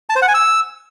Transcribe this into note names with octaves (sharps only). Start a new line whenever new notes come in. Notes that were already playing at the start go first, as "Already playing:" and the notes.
A5
C5
F#5
G#5
E6